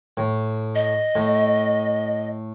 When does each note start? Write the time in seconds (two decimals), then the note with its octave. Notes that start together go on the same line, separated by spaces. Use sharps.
0.17 A2
0.75 D#5
1.15 A2